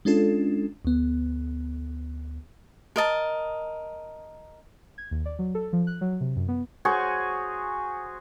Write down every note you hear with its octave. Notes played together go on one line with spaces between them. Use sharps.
G#3 C#4 D4 F4 A4
D2 B3
A#4 D#5 A5
G#6
D#2
D5
F#3
A4
F3
F#6
F#3
C3
F#2
B3
F#4 G#4 C5 C#5